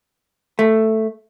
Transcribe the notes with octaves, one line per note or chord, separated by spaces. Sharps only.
A3